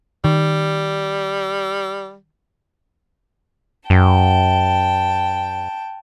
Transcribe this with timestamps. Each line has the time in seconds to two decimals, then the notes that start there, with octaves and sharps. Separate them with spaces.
0.24 D#3 G3
3.90 F#2 G5 A5